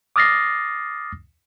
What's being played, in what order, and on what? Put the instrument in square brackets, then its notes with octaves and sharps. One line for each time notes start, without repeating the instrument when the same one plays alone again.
[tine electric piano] D6 D#6 F6 A6 A#6 C7